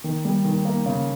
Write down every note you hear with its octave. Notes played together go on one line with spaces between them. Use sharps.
D#3
G3
D#3
A#3
C#3